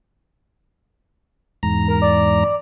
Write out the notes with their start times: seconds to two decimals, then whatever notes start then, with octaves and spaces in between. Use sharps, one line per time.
1.63 E2 G#2 A#5
1.88 A#4
2.02 D5